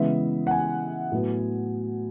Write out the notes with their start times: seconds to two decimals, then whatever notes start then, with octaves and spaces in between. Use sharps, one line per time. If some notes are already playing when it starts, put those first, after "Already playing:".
Already playing: C#3 E3 G#3 B3 E5
0.47 F#5
0.51 G#5
1.12 A2 F#3 B3